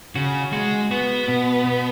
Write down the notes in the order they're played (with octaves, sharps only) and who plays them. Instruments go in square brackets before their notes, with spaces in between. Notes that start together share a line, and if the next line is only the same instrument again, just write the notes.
[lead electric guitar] C#3 [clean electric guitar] F#4
[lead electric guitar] G#3 [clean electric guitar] F#4
[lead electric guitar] B3 [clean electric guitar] F#4
[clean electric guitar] B2
B2